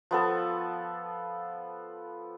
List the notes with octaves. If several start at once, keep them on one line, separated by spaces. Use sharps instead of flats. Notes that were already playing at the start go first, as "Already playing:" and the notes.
F3 B3 A4